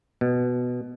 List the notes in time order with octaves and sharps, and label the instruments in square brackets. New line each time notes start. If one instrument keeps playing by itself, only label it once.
[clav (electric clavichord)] B2